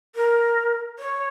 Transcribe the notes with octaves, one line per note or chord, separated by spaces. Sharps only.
A#4
C#5